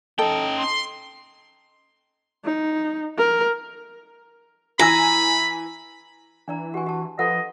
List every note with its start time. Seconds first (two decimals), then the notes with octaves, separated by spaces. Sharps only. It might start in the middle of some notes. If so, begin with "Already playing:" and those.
0.19 C#4 D#4 A4 G5
0.57 C6
2.45 D#4
3.18 A#4
4.79 E3 G#5 A#5 B5 E6
6.48 E3 D4 D5 A#5
6.74 F#4 G4 G#5
6.86 G4 A5
7.19 F3 G4 A4 B4 D#5 F#5